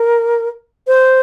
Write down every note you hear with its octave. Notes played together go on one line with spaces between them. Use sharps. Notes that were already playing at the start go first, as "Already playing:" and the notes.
Already playing: A#4
C5